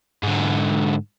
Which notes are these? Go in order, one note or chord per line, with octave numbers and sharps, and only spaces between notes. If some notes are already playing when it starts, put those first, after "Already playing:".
G#2 D3